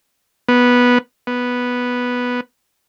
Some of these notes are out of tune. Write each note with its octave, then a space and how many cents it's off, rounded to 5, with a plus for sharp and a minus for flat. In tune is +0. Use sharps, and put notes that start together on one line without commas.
B3 -10
B3 -5